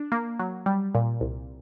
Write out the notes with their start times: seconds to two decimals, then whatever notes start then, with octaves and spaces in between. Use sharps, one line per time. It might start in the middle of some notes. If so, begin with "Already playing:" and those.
Already playing: D4
0.12 A#3
0.39 F#3
0.66 G3
0.95 A#2
1.21 C2